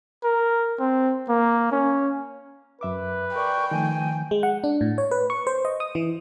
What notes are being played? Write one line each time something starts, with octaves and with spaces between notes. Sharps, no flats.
A#4
C4
A#3
C#4
F#2 B4 E5 D6
A#4 D5 G5 C#6 D6
D#3 F3 A3 G#5
G#3
F#5
D4
A2
C#5
B4
C#6
C5
D#5
D#6
E3